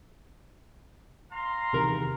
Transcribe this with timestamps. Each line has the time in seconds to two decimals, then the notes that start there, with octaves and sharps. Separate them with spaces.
1.32 F5 A#5 C6
1.73 E2 C3 D#3 A#4